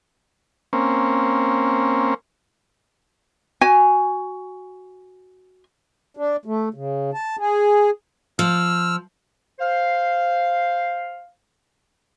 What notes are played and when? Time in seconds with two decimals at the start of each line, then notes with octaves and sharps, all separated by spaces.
0.73 A#3 C4 C#4
3.61 F#4 G#5
6.17 D4
6.45 A3
6.74 C#3
7.14 A5
7.39 G#4
8.39 F3 E6 F6
9.59 C5 F5